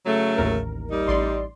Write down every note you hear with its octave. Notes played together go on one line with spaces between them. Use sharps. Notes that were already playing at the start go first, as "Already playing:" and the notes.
C#3 F#3 A3
A1 D#2 A#4
G3 D#4
A1 D5 C6